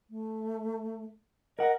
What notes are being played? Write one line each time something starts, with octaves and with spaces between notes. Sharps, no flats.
A3
A#4 D#5 F#5